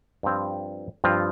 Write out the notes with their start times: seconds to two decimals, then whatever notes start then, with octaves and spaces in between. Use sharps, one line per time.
0.23 G2 F3 C4 F4
1.04 G2 F3 C4 F4